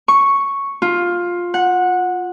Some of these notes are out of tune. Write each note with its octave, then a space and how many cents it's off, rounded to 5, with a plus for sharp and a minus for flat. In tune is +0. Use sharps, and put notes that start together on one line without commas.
C#6 +0
F4 +10
F#5 -15